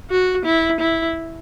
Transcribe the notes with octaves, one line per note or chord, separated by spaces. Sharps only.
F#4
E4
E4